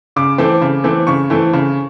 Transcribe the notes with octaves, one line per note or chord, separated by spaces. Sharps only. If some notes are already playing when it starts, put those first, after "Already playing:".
C#3 D6
E3 A3 C4
C#3
E3 A3 C4
C#3 C#6
E3 A3 C4
C#3